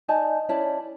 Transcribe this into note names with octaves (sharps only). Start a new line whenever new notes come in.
D#4 D5 G#5 A5
C#4 E4 D5 A5